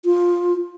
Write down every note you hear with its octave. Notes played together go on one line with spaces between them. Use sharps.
F4